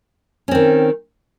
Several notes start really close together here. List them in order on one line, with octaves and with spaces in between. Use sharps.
C#4 C4 D#3